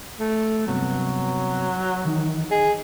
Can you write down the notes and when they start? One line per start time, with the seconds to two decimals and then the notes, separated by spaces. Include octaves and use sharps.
0.19 A3
0.67 G2 C3 F#3 B3
2.05 D#3 E3 D#4
2.51 G#4 D#5